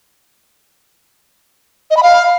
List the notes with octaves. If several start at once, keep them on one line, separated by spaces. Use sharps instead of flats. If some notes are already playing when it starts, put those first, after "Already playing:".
D#5
B5
F5